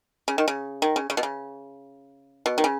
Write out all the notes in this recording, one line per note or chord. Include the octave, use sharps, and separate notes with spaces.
C#3
D#3
C#3
D#3
C#3
C#3
B2
C#3
B2
D#3
C#3